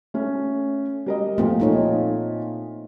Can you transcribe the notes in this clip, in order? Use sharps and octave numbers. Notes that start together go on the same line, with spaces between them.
A3 C#4
G3 A#4 D#5
A#2 F3 A3 C4
A3 D#4 C#5